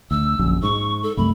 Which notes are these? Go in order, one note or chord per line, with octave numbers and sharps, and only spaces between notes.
D2 E6
A#1 F#2
G#2 C#6
A4
C2 F#2 A3 B5